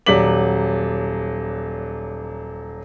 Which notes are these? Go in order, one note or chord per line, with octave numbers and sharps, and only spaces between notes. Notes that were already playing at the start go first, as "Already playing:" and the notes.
D#1 F#3 D5 D6 B6 F#7